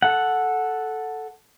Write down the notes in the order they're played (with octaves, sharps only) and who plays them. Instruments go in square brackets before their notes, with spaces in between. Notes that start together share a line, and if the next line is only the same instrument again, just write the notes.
[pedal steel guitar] A4 F#5